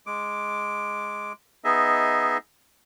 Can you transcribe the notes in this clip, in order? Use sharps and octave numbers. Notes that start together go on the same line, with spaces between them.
G#3 D6
B3 D#4 G#4 D#5 E5